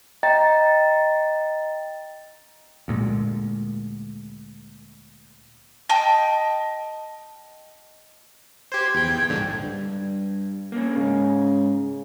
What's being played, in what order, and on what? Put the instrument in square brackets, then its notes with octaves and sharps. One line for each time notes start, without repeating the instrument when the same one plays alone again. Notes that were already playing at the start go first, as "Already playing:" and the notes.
[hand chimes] D#5 G5 A#5 A6
[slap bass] D2 A#2 G#3
[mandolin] D#5 G5 A5
[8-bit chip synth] G4 C5 [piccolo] G#6
[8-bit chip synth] E2 G5
A#1 G#2 D3
[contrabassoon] G2
[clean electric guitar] A#3 C#4
[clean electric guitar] G#2 [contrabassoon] C#3